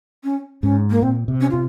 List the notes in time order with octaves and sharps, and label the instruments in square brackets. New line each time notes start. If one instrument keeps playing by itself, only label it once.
[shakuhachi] C#4
[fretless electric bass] G#2 [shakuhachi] C#4
[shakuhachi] A#3
[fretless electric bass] A#2 [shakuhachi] C4
[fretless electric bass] C3
[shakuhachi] C#4
[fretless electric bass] C3 [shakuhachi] F4